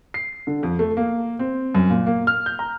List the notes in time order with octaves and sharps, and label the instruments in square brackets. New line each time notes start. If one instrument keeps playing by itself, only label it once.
[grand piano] C7
D3
F2
A3
A#3
C4
F#2
A#2
A#3
F6
G6
A#5